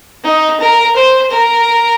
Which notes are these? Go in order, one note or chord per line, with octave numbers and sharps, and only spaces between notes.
D#4
A#4
C5
A#4